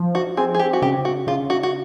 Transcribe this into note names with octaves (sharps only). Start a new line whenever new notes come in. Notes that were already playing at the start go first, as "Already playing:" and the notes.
Already playing: F3
F#4
C4 G#4
G#4
G4
F#4
C#3 G4
F#4
C#3 F4
F#4
F#4